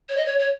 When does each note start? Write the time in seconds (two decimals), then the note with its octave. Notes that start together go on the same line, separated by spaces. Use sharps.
0.09 C#5
0.17 D#5
0.26 C#5
0.39 C#5